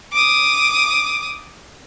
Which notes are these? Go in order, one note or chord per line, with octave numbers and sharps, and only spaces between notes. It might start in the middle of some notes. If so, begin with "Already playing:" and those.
D6 D#6